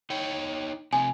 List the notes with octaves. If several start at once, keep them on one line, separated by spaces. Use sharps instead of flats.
D#4 C#5 G5
C3 F3 C4 G#5